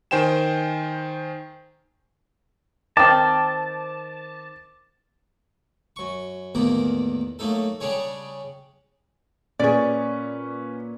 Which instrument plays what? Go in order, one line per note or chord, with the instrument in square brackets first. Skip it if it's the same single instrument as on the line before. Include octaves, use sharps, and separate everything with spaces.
[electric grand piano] D#3 C5 G5 G#5 E7
[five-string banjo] D#3 C4 [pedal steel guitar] A5 [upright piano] D6
[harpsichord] F#2 C#6
A1 E2 D#3 A#3 B3 D6
F#3 A3 A#3 D#4 A4
C#3 G3 C#4 D4 G#4 C#5
[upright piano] A#2 [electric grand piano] C#4 B4 C#6 [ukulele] G#4 D5